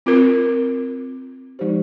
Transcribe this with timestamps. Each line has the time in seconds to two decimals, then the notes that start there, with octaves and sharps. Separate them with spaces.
0.06 C4 F4 A#4
1.59 F3 G#3 D#4 G4 C5